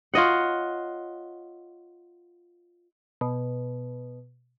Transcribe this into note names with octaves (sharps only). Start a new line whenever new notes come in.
F4 C#5 D#5 F#5
B2